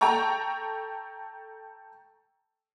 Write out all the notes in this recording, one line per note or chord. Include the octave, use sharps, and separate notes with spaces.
A4 G5 A5 A#5 C#6